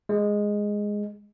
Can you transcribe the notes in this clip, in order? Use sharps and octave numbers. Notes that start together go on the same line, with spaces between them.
G#3